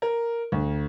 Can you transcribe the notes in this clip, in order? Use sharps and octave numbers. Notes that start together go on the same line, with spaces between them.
A#4
D2